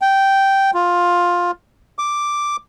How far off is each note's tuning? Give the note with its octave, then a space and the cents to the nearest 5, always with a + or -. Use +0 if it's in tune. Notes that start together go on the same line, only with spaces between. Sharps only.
G5 -10
F4 +10
D6 +0